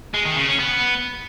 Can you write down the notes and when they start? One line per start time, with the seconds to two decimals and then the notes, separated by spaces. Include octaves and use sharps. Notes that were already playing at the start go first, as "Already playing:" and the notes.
0.14 G#3
0.25 D#3
0.37 C#3
0.48 C#4
0.59 B3